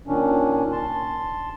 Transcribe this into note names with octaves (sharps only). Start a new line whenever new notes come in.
A#2 D#3 C#4 D4
A5 C6